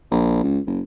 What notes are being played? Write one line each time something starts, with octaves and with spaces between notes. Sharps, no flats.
A#1
C#2
F#1